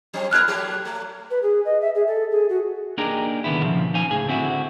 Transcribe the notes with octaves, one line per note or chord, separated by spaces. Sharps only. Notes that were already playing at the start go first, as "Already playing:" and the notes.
F#3 C4
A#2 E4 A#4 F6 F#6 G#6
F#3 A3 G4
A3
B4
G#4
D#5
E5
G#4
A4
G#4
F#4
A#3 D4 D#4 G4 G#4 A#4
C2 D3 D#3 B3 E4
A#2 C#3 F3
D#4 C5 F5 G#5
C#2 A2 G#4 G#5
D3 C4 E4 F#4